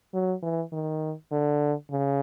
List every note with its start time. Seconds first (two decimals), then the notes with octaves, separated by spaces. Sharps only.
0.14 F#3
0.42 E3
0.72 D#3
1.32 D3
1.91 C#3